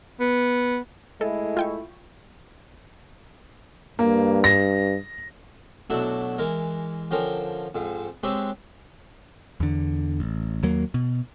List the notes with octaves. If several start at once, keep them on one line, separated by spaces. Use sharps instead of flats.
B3
G#3 A3 E4 A4
F4 G5 C#6
G2 A#3
A#6
B2 F#3 A3 D4 E4
E3 G#3 A#4
D3 F3 C#4 A#4 G5
F2 G#2
G#3 C4 G4 B4 C#5 E5
E2 D3
A1
D#2 F#3 A#3
B2